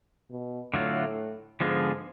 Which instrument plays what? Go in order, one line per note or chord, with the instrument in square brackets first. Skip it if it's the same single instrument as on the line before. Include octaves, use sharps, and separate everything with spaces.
[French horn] B2
[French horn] A2 [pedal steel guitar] D3 F#3 A3 F4
[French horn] G#2 [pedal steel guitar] D3 F3 G#3 B3 F4